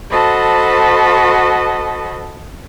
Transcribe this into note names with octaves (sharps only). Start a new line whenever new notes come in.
F#4 A4 C5 D#5 A5 B5